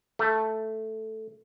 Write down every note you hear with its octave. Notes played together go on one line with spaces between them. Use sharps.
A3